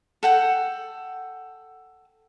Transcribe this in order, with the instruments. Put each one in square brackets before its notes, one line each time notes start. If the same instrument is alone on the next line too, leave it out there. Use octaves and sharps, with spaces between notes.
[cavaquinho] A4 F#5 G5